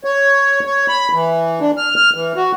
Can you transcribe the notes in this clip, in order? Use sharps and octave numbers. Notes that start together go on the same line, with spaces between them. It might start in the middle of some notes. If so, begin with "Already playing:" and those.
C#5
C#5
B5
E3
D4
F6
F6
E3
F#4